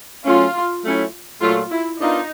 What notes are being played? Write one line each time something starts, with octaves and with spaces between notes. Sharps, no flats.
F#3 A3 C#4 F4
F#3 A3 C#4 E4
A#2 F#3 A3 F4
E4
B3 D4 D#4 F4 A#4 D#5